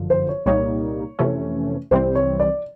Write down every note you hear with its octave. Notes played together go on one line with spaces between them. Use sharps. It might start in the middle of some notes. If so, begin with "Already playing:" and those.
Already playing: G1 F#2 D3 F3
C5
C#5
C2 A#2 G3 A#3 D#4 C#5
F2 C3 E3 A3 C#4
C2 C3 E3 G3 C4 C5
C#5
D5